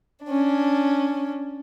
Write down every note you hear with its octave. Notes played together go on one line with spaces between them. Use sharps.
C#4 D4